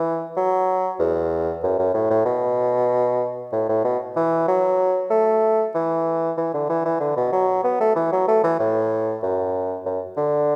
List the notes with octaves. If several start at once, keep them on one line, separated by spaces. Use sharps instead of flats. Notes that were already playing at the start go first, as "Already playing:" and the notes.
Already playing: E3
F#3
E2
F#2
F#2
A2
A2
B2
A2
A2
B2
E3
F#3
A3
E3
E3
D3
E3
E3
D3
B2
F#3
B3
A3
E3
F#3
A3
E3
A2
F#2
F#2
D3